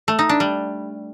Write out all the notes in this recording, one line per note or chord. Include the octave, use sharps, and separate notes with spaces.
A3
D#4
D4
G3